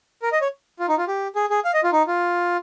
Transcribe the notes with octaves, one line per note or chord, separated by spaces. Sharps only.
A#4
D#5
C#5
F4
D#4
F4
G4
G#4
G#4
F5
D#5
F4
D#4
F4